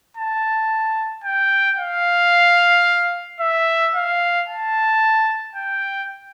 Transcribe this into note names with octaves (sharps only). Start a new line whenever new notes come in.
A5
G5
F5
E5
F5
A5
G5